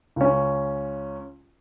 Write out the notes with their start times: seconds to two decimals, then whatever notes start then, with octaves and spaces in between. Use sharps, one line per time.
0.16 C#2 C#4